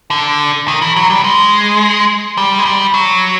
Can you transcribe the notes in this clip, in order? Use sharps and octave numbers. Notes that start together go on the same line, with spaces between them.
D3
D#3
E3
F#3
G3
G#3
G3
G#3
G3
F#3